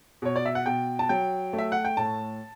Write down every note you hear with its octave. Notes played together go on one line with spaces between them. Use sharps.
B2 C#5
D5
E5
F#5
B2 G5
A5
F#3 G5
A3
E5
F#5
G5
A2 A5